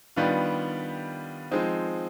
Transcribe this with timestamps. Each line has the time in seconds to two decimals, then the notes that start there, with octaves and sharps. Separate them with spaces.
0.16 D#3 G3 B3 D4 F4
1.51 F3 G#3 C4 D#4